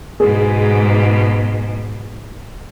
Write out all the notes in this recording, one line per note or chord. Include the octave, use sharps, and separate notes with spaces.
G#2 B2 G#4